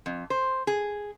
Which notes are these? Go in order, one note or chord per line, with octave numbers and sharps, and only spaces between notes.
F2
C5
G#4